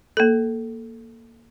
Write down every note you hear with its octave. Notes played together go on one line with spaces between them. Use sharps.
A#3 A4